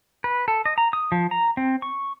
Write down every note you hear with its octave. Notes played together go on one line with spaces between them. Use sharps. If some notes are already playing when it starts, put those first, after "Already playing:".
B4
A4
D#5
A#5
D#6
F3
A#5
C4
C#6